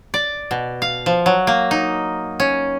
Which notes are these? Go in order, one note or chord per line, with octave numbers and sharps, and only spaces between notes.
D5
B2
F5
F3
F#3
A#3
D#4
C#4